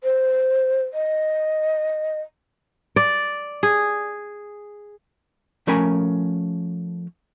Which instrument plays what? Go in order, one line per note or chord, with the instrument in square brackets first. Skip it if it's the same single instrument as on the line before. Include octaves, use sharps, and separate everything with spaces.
[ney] C5
D#5
[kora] D5
G#4
[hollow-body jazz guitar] F3 A3 C#4 A#4 G#5 B5